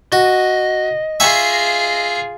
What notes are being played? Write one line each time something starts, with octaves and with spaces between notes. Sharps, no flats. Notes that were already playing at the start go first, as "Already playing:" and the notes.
F#4 D#5
F4 G#4 E5 G#5 C#6